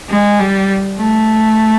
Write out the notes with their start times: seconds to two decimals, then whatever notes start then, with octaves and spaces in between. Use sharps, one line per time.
0.09 G#3
0.39 G3
0.97 A3